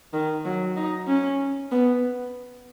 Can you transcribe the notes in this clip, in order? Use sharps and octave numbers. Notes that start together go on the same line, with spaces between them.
D#3
F#3
D#4
C#4
B3